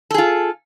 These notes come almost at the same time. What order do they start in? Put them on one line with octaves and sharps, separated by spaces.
A4 G#4 F4